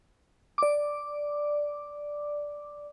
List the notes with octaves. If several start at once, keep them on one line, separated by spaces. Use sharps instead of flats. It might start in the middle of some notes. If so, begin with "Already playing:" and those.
D5 D6